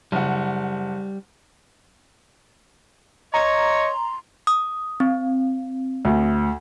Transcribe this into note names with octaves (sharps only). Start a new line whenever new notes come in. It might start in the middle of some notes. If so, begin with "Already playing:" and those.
F#1 G3 F#5
C#5 D#5 A#5 C6
D#6
C4
D2